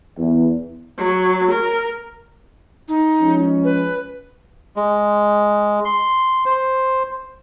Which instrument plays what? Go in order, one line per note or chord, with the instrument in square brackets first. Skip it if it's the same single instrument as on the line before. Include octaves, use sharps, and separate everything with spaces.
[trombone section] E2
[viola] F#3
A#4
[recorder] D#4
[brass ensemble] F3 G#3 C#4
[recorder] B4
[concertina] G#3
C6
C5